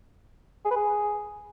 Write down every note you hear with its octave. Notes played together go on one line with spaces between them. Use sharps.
G#4
B4
G#4